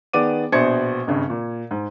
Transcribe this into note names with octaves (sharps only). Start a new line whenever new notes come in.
D#3 B3 G#4 D5 D6 D#7
A#1 B2 C5 D5 G#6 C#7
G#1 G2 C#3
A#2
G#2